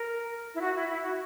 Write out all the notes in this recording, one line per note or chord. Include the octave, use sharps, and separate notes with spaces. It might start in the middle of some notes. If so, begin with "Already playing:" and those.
Already playing: A#4
E4
F#4
E4
E4
F#4